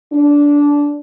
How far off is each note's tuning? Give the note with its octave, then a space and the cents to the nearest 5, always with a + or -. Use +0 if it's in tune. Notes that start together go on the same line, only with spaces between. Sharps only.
D4 -15